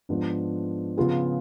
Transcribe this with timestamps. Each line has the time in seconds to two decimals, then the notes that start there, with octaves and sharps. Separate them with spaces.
0.09 G#2 F3 B3 D4
0.97 C#3 F3 B3 F4 G#4